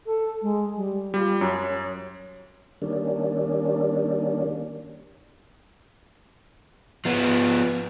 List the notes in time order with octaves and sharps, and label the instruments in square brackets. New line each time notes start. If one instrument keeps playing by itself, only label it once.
[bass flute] A4
G#3
G3
[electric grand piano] G3 [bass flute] F4
[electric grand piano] F#2 [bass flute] C#5
[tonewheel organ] D#3 G3 A#3 C#4 D4
[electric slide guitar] F3 B3